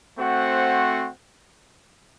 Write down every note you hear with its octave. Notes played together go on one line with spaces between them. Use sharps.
A3 C4 F#4 C5 F#5